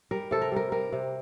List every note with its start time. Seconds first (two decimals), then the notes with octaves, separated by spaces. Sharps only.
0.11 G3 A#4
0.31 C3 A4
0.41 A#4
0.52 G3 A#4
0.72 G3 A#4
0.92 C3